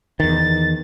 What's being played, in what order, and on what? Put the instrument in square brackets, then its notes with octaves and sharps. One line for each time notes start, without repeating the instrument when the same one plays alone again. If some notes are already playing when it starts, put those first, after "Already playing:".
[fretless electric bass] E2 D#3 [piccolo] A6